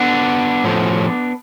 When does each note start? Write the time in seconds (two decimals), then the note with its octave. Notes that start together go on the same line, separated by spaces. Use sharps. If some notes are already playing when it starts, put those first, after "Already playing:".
Already playing: B3 D4
0.64 A2 F3